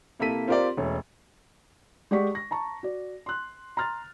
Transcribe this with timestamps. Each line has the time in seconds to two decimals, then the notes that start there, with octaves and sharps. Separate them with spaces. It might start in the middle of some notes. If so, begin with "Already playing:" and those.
0.19 C3 A#3 E4 A4 B6 D#7
0.48 C4 F4 G4 A#4 C5 D5
0.77 E1 A3 C#4
2.11 G#3 G4 D5 F#5 C#6 B6
2.32 C#6 A#6
2.51 A5 A#5 C#6
2.83 F#4 D5
3.26 C6 F#6
3.77 A#5 C6 F6 A6